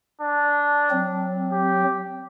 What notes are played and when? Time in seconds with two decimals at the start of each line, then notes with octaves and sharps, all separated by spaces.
0.21 D4
0.91 F#3 C4
1.52 G4